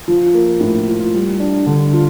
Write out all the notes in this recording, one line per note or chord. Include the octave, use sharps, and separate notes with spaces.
F3
A#3
A2
F4
G3
D4
D3
F4